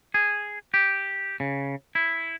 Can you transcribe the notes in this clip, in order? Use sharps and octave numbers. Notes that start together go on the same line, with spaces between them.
G#4
G4
C#3
E4